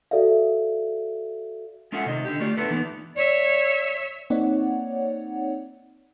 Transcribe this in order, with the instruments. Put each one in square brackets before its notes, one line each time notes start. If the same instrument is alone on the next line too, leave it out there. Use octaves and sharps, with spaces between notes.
[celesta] F#4 A4 D5 E5 F5
[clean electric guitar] G#3 C#4 F4 A4 E5 F#5
C3 D#3 D#5
D3 G4
A3 F4 D5
B3 D4 E4 F4 A4 B4
E3 B3 D#4
[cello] C#5 E5 [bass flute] D5
[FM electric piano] A#3 C4 D#4 C#5 D5 F#5